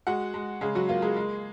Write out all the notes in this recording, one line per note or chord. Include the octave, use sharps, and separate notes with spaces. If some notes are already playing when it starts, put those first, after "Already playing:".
G#3 F#4 F#5
G#3
C#3 G#3 G#4
F#3 F#4
A#3 F4
G#3 G#4
G#3